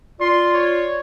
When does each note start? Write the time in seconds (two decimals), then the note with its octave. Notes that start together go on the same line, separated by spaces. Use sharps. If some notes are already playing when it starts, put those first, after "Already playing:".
0.20 F4 D5 C6
0.54 C#5